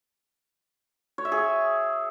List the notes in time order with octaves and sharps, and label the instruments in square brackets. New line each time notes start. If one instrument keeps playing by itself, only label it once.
[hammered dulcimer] C#5
E5
G#4